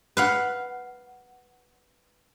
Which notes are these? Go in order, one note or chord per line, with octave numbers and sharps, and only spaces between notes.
B4 F5 F#5